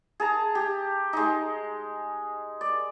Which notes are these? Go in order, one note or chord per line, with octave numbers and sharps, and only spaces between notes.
G#4 A5 A#5
G4
G#3 D#4
D5